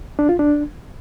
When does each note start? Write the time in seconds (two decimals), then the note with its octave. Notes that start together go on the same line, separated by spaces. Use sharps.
0.19 D4
0.29 F4
0.39 D4